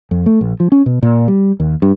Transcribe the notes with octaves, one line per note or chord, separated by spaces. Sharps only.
F2
A3
A#1
F3
C#4
B2
A#2
G3
D#2
G2